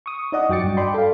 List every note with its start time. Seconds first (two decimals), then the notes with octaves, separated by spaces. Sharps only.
0.06 C#6 D#6
0.32 D#4 D5 D#5 F#5
0.49 F#2 F#4 G5 D6 A6 C#7
0.64 G2
0.77 D5 G5 B5 C6
0.94 A4 F5